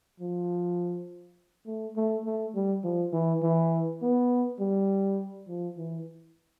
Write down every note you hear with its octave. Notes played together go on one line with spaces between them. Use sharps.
F3
A3
A3
A3
G3
F3
E3
E3
B3
G3
F3
E3